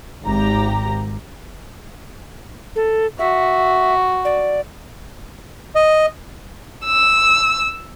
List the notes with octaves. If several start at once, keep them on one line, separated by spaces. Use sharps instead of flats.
G#1 G4 A#5
A4
F#4 E5
D5
D#5
E6